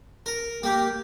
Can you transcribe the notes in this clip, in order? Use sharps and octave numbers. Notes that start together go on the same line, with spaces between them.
A#4
A#3 G4